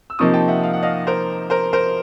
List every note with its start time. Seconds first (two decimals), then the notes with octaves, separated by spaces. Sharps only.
0.10 E6
0.19 C3 F3 A#3 D#4 C#6 D#6
0.34 G5 A5
0.48 E5 F#5
0.63 F5
0.73 F#5
0.83 D#5 F5
1.07 A#4 C5
1.50 A#4 C5
1.73 A#4 C5